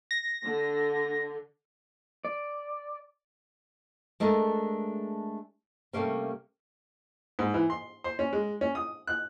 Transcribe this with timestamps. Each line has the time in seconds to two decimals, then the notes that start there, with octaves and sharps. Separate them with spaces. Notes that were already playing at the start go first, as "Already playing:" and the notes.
0.11 A#6
0.44 D3
2.25 D5
4.20 G#3 A3 D4 G#4 A#4
5.93 C3 F3 G3 A3 A#3 C#4
7.39 G#2
7.54 E3
7.70 C6
8.04 C5
8.19 C#4
8.33 G#3
8.61 C#4
8.75 D#6
9.07 F#6